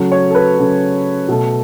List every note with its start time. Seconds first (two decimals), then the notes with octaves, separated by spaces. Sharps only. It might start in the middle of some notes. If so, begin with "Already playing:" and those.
Already playing: C#3 F#3 A3
0.12 C#5
0.31 A4
0.35 B4
0.59 C#3 F#3 A3
1.29 B2 A3